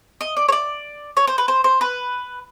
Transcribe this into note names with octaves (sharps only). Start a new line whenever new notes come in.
D#5
D5
C#5
D5
C#5
C5
B4
C5
C5
B4